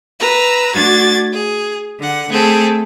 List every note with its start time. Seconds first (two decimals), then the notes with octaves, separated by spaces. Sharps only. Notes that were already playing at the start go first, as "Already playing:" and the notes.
0.19 B4 A#5 E6
0.74 A3 D4 F#4 G#6 A6
1.32 G#4
2.00 D3 F#5
2.31 A3 C4 G#4 A4